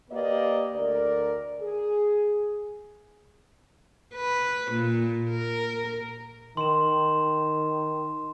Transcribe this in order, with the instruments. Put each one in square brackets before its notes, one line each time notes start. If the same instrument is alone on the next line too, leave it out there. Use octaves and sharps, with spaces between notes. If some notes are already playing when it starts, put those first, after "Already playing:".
[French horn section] A#3 G4 B4 D5 D#5
D2 A#4 D5
G#4
[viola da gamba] B4
A#2
A#4
[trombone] D#3 [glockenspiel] C6 E7